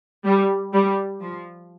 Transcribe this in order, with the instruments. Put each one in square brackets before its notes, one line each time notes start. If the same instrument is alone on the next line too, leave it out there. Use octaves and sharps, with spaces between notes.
[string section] G3
G3
F3